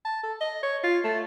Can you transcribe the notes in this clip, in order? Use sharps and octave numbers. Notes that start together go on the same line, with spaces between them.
A5
A4
D#5
C#5
F4
A3